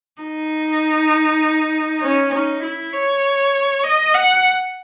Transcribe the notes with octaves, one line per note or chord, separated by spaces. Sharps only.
D#4
C#4
D#4
E4
C#5
D#5
F#5